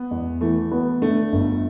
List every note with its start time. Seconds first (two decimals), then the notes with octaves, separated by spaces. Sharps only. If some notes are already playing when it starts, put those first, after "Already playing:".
Already playing: B3
0.11 E2
0.41 E3 A3
0.72 B3
1.02 D3 A3
1.32 G1